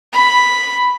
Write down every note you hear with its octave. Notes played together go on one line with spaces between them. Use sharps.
B5